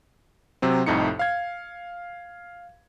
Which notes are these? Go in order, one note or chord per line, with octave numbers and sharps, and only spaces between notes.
C3 F#3 C4
C2 F2 A2 D#4 C#7
F5 G#6